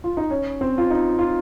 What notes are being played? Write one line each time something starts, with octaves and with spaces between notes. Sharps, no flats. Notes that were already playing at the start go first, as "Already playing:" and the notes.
F4
D#4
C#4
C4
F4
D#4
F4